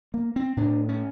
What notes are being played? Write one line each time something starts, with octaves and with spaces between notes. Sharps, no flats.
A#3
C4
A2 D4
C#4